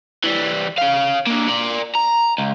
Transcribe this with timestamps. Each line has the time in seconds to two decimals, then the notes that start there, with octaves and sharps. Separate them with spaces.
0.24 E3 G3
0.78 C#4 F5
1.26 D3 A#3
1.48 A#4 D5
1.95 A#5
2.38 C#2